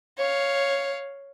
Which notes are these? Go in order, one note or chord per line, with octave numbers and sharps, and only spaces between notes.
C#5 F5